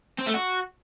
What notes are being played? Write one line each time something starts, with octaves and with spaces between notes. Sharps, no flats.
C4
A3
F#4